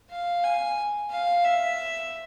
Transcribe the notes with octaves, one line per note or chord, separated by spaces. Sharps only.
F5
G#5
F5
E5